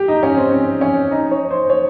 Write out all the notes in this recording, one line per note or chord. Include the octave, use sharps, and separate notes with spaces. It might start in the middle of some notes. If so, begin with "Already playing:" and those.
Already playing: G4
D#4
C#4
C4
C4
C#4
D#4
C#5
C5
C#5